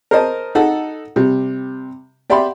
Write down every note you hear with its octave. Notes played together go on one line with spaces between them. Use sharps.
A#4 C5 D#5 A5
D#4 A4 F#5 A5
C3 G3
G4 D5 E5 G5 B5 C6